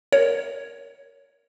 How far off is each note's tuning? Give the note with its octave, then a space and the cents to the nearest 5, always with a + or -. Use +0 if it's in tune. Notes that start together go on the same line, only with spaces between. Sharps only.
A#4 +0 C#5 +0